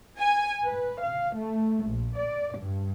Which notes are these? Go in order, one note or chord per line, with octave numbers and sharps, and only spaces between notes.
G#5
B4
F5
A3
A#1
D5
G2